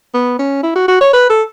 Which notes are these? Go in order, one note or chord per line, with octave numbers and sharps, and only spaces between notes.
B3
C#4
E4
F#4
F#4
C#5
B4
A4